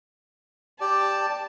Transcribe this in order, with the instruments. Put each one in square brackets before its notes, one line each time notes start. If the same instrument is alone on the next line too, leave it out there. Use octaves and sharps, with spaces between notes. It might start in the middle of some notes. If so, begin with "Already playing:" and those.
[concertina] G4 D5 [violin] A5